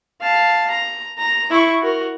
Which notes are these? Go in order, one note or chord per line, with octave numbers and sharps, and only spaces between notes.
F5 A5
A#5
A#5
E4 C#6
F#4 A#4